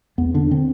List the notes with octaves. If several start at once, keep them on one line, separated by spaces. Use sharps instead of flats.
E2 B3
D3 D4
D3 C4